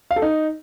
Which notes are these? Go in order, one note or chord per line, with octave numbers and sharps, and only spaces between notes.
F5
A4
D#4